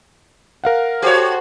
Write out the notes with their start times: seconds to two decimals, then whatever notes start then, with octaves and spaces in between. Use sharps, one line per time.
0.64 A#4 F5 F#5
1.02 F#4 G4 A4 C5 C#5